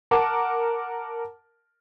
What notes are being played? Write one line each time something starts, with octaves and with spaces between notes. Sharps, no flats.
A#4 F#5 A5 D6